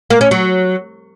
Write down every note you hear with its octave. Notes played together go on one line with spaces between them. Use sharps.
A#3
C#4
F#3